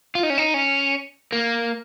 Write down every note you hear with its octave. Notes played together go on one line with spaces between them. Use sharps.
F4
D#4
C#4
D#4
C#4
A#3